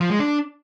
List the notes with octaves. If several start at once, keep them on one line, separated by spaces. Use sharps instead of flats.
F3
G#3
D4